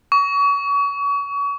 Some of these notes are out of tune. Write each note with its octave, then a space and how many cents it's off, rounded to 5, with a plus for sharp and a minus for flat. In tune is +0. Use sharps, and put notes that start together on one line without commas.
C#6 +35